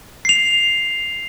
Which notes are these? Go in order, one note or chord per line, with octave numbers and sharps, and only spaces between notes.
C7 F7